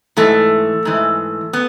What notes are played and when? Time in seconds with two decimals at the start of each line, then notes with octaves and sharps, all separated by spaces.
0.17 G#2 E3 A3
0.85 G#2 E3
1.53 B3